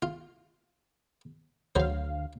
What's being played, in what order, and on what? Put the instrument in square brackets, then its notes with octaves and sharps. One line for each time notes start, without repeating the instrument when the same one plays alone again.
[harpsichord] F4
[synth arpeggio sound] D2 F5 [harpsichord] F#3 C5